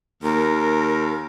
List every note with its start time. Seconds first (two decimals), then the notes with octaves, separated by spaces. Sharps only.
0.23 D#2 A#4